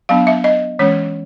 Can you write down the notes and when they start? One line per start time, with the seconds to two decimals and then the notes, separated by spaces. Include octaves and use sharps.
0.09 F#3 B3 D4 F5
0.27 E5
0.44 D#5
0.79 E3 G#3 C#4 C#5